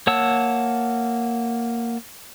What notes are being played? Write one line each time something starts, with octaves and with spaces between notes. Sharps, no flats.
A#3 C#5 F#5 A5 E6